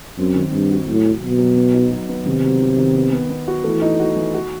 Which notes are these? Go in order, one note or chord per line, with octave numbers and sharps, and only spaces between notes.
F#2 C4
D#3
G2 C4
F#4
A2 F#3
F#3
B2 F#3
F#3
B3
D#4
F#3
B3
C3 D#3
F#3
D#3
D#3
B3
B3
B3
F#4
E3 A3
D#4
F#4
E3
F#4